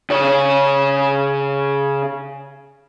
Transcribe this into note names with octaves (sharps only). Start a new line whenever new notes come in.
C#3 C#5